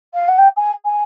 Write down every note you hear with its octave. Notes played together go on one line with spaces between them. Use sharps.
F5
F#5
G5
G#5
G#5